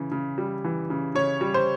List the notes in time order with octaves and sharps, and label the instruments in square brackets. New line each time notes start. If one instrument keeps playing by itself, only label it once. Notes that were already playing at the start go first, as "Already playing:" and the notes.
Already playing: [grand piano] C#3 E3
C#3
G3
E3
C#3
C#3 C#5
G3
C5